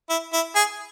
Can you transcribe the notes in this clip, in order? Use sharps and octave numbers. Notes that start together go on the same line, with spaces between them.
E4
E4
G#4